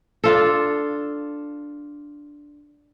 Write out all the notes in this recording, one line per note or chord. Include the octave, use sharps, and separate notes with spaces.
D4 F4 A4